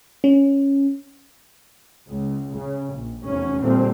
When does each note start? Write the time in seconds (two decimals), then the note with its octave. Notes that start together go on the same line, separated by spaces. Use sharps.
0.24 C#4
2.10 C#2
2.55 C#3
2.94 A#1
3.24 F1 E2 C#4
3.62 D#2 A#2 D3 G3 A3 C4